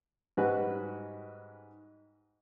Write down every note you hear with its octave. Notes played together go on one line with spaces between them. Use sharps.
G#2 G3 C#4 F#4 B4